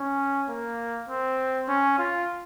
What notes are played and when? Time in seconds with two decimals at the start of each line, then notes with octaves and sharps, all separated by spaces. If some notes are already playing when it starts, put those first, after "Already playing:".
Already playing: C#4
0.48 A#3
1.09 C4
1.68 C#4
1.98 F4